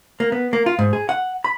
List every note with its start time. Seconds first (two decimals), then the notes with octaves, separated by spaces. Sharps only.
0.20 A#3
0.32 B3
0.53 A#3
0.66 F4
0.79 G#2
0.93 G#4
1.09 F#5
1.44 B5